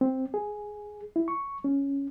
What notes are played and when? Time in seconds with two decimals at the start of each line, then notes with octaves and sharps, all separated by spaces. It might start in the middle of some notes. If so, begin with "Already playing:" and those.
0.01 C4
0.34 G#4
1.16 E4
1.28 C#6
1.64 C#4